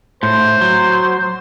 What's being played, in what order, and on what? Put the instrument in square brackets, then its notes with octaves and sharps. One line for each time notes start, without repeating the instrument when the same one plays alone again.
[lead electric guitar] A2 [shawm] C5
[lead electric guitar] F#3